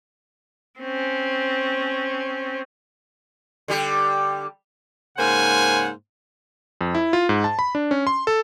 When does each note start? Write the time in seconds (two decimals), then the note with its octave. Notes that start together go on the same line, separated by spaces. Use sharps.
0.80 C4 C#4
3.68 D3 G3 G4
5.18 G#2 C#3 A#3 C5 F#5 G#5
6.81 F2
6.95 E4
7.13 F4
7.29 G#2
7.44 A5
7.59 B5
7.75 D4
7.91 C#4
8.07 C6
8.27 A4